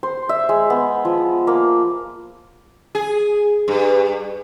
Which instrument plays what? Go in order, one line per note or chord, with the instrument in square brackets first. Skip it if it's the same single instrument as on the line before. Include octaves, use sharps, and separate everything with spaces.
[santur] C5
E5
G#3
B3
F3
A#3
[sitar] G#4
G2